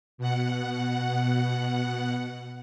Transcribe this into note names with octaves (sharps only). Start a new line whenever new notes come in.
B2 F#5